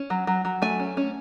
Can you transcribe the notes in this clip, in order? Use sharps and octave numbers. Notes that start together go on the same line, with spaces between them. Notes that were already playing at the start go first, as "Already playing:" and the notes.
Already playing: C#4
F#3
F#3
F#3
A3 G#5
C#4
C#4